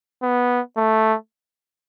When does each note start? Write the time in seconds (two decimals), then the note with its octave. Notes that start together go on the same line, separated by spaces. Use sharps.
0.23 B3
0.77 A3